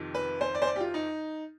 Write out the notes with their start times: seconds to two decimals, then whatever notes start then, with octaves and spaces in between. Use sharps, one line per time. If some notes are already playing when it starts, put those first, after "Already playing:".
Already playing: F2 C3 D#3
0.15 B4
0.41 C5
0.55 D5
0.62 C5
0.67 D5
0.76 G4
0.81 F4
0.94 D#4